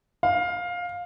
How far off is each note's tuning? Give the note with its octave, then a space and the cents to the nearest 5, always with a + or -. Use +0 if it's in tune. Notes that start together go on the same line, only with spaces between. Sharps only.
F5 +15